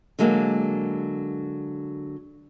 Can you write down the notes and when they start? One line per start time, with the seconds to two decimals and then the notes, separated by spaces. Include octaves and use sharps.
0.19 D3 F#3 G#3 A#3